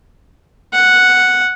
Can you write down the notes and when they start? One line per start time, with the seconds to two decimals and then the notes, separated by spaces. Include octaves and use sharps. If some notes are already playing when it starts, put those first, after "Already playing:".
0.73 F#5